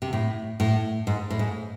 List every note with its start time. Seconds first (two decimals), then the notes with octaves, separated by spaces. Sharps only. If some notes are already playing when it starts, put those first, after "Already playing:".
0.02 C3
0.13 A2
0.60 A2
1.07 G#2
1.30 A2
1.39 G#2